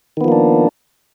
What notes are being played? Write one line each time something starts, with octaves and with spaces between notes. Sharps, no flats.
D#3 F3 A#3 B3 D4